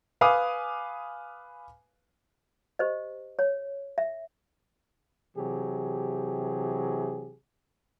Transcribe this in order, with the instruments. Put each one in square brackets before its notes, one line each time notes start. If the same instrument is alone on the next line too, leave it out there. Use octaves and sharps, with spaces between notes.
[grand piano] B4 F5 G#5 D6 D#6
[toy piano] G4 C5 D#5
C#5
E5
[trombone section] C3 E3 F#3 G4 G#4